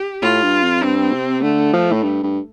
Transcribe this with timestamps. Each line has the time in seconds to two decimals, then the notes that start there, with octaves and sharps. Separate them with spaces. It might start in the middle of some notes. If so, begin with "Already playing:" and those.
Already playing: G4
0.22 A2 F4
0.43 G2
0.63 F2
0.82 G2 C4
1.13 C3
1.43 D3 A3
1.74 F3
1.92 A2
2.03 G2
2.23 G2